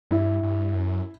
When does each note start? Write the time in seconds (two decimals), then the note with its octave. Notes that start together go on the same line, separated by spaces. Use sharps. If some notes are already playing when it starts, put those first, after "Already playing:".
0.11 G2 E4
0.43 G2
0.74 F#2